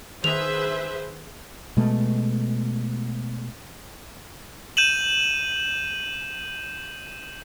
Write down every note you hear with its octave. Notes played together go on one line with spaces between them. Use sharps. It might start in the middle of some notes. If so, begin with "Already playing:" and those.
D#3 G#4 B4 C5 E5 F7
B2 G#3 A3
G6 D#7 E7 F#7